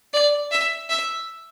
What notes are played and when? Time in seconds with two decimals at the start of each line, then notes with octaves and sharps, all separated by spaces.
0.13 D5
0.51 E5
0.89 E5